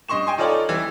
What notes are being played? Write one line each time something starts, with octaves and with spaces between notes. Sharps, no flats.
G2 D#5 C6 C#6 E7
G5 G#5 C6
D#4 F4 A4 C#5 D5
E3 G3